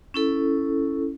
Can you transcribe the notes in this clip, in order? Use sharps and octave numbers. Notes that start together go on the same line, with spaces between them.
C#4 E4 A4